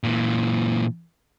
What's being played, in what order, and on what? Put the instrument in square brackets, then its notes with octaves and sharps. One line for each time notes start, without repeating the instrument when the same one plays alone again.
[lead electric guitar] A#2 E3